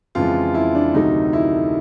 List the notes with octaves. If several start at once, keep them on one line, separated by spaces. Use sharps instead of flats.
F2 C#3 E3 G#3 F4
E4
D4
D2 C3 D#3 F#3 A3 D#4
E4